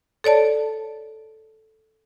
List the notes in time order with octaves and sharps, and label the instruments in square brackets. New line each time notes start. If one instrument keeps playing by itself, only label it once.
[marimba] A4 C#5 D5 A5